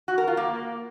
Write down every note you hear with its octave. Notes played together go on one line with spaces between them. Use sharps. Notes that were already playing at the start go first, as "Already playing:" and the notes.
F#4
A#4
F4
A#3